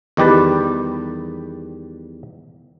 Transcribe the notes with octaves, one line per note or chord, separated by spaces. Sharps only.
E2 D#3 G3 G4 B4 A5